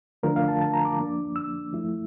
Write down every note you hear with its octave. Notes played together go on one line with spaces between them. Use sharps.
D3 F3 A3 D4 F4 A#4
F5
A5
A5
A#5
D6
F3 A#3 D4
E6
F3 A3 E4